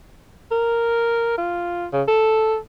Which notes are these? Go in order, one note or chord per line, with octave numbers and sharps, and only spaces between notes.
A#4
F4
C#3
A4